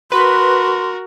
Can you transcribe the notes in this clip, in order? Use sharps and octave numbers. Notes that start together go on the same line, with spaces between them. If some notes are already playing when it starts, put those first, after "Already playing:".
F#4 A#4 B4 C6